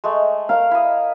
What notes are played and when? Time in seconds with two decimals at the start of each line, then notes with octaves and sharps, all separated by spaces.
0.04 G#3 A3
0.49 A#4 F5
0.71 E4 D#5